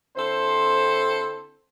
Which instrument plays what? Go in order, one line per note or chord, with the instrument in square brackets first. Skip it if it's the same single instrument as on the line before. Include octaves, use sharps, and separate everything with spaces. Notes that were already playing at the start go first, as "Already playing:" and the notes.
[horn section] D3 C4 E4 A4 C5